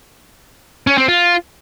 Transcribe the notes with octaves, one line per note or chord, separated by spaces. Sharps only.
C#4
C4
F4